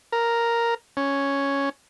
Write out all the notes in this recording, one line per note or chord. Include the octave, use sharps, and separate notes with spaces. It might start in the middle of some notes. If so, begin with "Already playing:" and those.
A#4
C#4